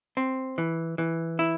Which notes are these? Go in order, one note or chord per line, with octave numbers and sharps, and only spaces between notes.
C4
E3
E3
E4